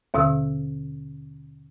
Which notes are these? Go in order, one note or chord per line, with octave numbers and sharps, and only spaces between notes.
D#2 B2 D3 E6